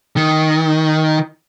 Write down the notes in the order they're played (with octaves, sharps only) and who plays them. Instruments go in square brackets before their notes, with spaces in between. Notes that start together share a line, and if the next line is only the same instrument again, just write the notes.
[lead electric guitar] D#3